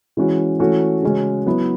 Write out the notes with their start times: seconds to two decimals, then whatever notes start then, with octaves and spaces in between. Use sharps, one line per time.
0.17 E3 G#3 C#4 F#4
0.59 E3 A3 C#4 F#4
1.03 C#3 G#3 C#4 F#4
1.46 F#3 B3 E4